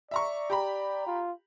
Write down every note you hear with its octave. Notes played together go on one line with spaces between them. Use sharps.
D5 E5 A#5 C#6
G4 A#5 B5
F4